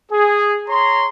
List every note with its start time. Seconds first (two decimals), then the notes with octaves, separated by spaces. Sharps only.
0.12 G#4
0.68 C#5 A#5 C6